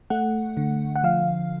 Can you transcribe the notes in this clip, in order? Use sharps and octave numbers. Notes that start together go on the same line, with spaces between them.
A3 F#5
D3
F#5
F3 F5